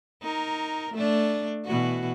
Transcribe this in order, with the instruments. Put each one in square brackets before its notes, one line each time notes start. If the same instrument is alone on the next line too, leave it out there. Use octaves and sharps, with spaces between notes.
[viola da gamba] D#4 A#4
A3 D4
B2 E3 F#4